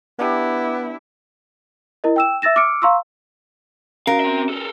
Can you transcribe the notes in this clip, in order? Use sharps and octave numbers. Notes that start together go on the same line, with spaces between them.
B3 D4 E4 G4
E4 A#4 D#5
G5 E6 E7
E5 E6 A6 A#6 E7
D6 E6 F6 C#7 D7
F5 A#5 C6 C#6 E6
C#4 F#4 A#4 F5
C4 E5
A4 A#4